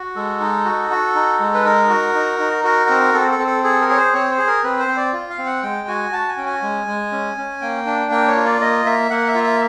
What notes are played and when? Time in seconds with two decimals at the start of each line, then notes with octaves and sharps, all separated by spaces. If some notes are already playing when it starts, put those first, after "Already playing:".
Already playing: F#4
0.16 G#3 A4
0.40 D#4
0.65 F#4
0.91 F#4
1.15 D#4
1.40 G#3
1.54 B4
1.65 D#4 A#4
1.90 F#4
2.15 D#4
2.40 D#4
2.64 F#4 A#4
2.89 C4
3.14 C4 A4
3.31 A4
3.39 C4
3.47 A4
3.64 G#4 A4
3.81 A#4
3.89 G#4 C#5
3.97 C5
4.13 C4 C#5
4.31 C5
4.38 G#4
4.47 A#4
4.63 C4 B4
4.79 C5
4.88 C4
4.97 D5
5.13 F4
5.30 F5
5.39 C4
5.47 F#5
5.63 G#3 G5
5.88 F#4 G#5
6.12 F#4 A5
6.29 G#5
6.37 C#4 G5
6.46 G#5
6.62 G#3
6.87 G#3
7.12 C#4
7.37 C#4
7.61 A#3 G5
7.86 D4
8.11 A#3 G5
8.28 C#5
8.36 F4
8.45 D5
8.61 A#3 D#5
8.86 A#3 E5
9.10 A#3 F#5
9.28 E5
9.35 F4
9.44 E5